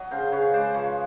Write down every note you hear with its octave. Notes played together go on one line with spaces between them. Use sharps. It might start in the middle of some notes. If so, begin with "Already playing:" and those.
Already playing: F#3 D#5
C#3 A#4 C5
C#3 B4 C#5
G#3 C5 D5
F3 B4 C#5